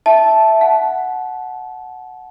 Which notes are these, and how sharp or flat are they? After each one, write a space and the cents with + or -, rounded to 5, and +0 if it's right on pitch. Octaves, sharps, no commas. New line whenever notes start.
E5 +0 A5 -10
F#5 +0 A5 -25